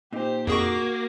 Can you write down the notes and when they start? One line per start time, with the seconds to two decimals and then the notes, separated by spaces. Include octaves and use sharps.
0.13 A#2 D#4 G4 C5
0.47 F2 A#3 F#4 G#4 C#6 D6